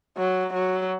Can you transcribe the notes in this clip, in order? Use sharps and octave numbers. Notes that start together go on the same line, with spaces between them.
F#3
F#3